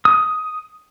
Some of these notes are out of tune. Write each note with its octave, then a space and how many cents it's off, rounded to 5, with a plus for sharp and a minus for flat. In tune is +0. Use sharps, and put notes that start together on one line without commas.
D#6 +10